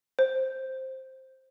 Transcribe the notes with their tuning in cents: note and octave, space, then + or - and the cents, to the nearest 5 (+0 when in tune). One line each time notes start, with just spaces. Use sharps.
C5 +5